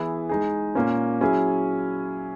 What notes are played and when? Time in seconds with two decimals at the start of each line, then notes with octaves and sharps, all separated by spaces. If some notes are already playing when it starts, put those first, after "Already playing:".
Already playing: E3 B3 E4 G#4
0.29 G#3 D#4 G#4
0.75 A#2 A#3 C#4
1.21 F#3 C#4 E4 G#4